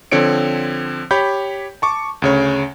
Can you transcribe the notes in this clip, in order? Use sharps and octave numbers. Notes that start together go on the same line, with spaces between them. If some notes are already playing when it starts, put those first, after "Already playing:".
D3 F3 C4 C#5 C#7 D7
G4 C#5 B5 G6
A5 C#6 D6
D2 C#3 C#5